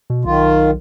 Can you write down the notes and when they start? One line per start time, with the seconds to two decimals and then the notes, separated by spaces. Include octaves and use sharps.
0.10 B2
0.25 B1 D#3 F4